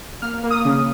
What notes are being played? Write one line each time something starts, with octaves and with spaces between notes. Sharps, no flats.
A#3 F6
A#3
D#6
C#3